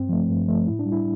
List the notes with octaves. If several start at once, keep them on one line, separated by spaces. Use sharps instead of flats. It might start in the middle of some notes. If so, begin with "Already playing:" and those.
Already playing: G2 C4
F3 A3
G2
F3 A3
A2 E4
D4
G3
E4